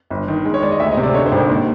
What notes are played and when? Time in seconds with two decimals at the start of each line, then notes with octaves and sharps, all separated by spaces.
0.10 G1
0.28 D#3
0.45 G#3
0.54 C#5
0.63 G#3 D5
0.71 D#5
0.80 D2 E5
0.91 D#5
0.97 C3
1.03 D5
1.14 D3 C#5
1.26 C5
1.32 G#1
1.38 A#4
1.49 D#2